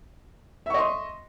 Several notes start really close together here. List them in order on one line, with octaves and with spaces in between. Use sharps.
E5 C#6 D#5 C6